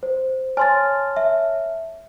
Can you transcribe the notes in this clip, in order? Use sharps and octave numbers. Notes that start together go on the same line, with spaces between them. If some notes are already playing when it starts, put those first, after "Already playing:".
C5
C#5 G#5 A5 C6 F6 A6
E5